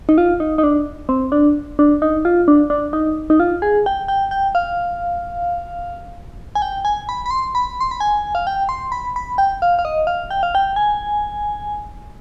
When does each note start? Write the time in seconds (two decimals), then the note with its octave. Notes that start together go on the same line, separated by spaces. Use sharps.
0.09 D#4
0.18 F4
0.40 D#4
0.58 D#4
0.64 D4
1.09 C4
1.32 D4
1.79 D4
2.02 D#4
2.25 F4
2.48 D4
2.70 D4
2.93 D#4
3.30 D#4
3.40 F4
3.62 G#4
3.86 G5
4.08 G5
4.31 G5
4.55 F5
6.55 G#5
6.62 G5
6.85 G#5
7.09 B5
7.26 B5
7.31 C6
7.55 B5
7.81 C6
7.91 B5
8.00 G#5
8.35 F5
8.47 G5
8.69 C6
8.92 B5
9.16 B5
9.38 G5
9.62 F5
9.79 F5
9.85 D#5
10.07 F5
10.31 G5
10.43 F5
10.55 G5
10.76 G#5